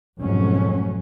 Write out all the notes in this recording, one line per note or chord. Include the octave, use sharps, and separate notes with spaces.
F1 G#2 B2 F#3 A3 C#4